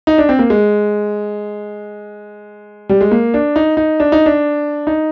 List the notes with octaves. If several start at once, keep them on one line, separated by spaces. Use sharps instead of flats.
D#4
D4
C4
A#3
G#3
G3
G#3
A#3
D4
D#4
D#4
D4
D#4
D4
D#4